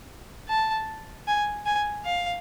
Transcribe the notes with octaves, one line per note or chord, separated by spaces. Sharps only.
A5
G#5
G#5
F5